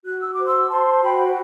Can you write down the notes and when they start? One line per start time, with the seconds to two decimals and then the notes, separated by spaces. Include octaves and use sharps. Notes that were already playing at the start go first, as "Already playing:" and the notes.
0.05 F#4 F#6
0.20 E6
0.33 C5 D6
0.46 C6 E6
0.70 C5 A5 C6
1.02 F#4 G5 B5